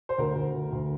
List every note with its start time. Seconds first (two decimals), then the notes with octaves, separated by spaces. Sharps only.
0.09 C5
0.18 D2 A#4
0.35 D2
0.54 D2
0.72 D2